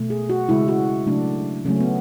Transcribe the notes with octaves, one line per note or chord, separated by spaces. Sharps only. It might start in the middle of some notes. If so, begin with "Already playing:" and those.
Already playing: B2 A3
G#4
F#4
C#3 G#3 E4
F#4
C#3 F#3 A3 D4
C#3 F#3 A3 C#4
B3